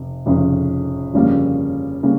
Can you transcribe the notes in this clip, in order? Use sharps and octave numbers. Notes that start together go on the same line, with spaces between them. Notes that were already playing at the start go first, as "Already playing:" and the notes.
Already playing: F1
F1 F2 C#3
G1 F2 C#3 G3 A#3
C#3 G3 A#3